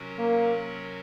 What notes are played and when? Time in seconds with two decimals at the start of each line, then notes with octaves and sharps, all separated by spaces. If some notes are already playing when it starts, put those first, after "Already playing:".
Already playing: C3 F#3 C#4 F#4 A#4
0.18 A#3